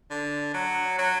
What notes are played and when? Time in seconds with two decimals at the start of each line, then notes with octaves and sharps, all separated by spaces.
0.11 D3
0.54 F#3
0.98 F#3